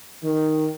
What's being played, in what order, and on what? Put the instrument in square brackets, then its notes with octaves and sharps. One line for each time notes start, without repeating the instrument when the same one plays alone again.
[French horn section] D#3